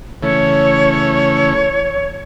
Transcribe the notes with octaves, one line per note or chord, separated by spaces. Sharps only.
C#3 E3 A3 C#5